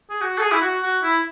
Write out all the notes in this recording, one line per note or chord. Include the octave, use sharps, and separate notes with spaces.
G#4
F#4
A4
G#4
E4
F#4
F#4
E4